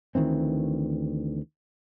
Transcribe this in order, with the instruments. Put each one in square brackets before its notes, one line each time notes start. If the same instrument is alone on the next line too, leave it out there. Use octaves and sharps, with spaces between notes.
[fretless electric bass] D2 D#3 E3 C4